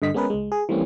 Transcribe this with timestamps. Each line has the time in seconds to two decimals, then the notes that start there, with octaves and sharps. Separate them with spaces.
0.02 G2 D3 D#5 B6
0.14 G#3 B3 C#4 G#4 A#4 B4
0.30 C#2 G#3
0.52 G#4
0.69 E3 G3 A3 A#3 C4 C#4